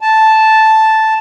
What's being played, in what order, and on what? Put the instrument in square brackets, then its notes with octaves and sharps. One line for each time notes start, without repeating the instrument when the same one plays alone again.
[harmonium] A5